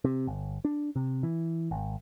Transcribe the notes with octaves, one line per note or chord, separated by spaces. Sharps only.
C3
G1
D4
C3
E3
G#1